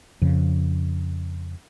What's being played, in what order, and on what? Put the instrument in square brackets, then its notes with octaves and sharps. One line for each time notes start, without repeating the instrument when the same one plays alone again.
[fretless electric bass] F2 C#3